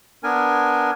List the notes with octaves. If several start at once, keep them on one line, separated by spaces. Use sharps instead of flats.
B3 D4 A#4 G#5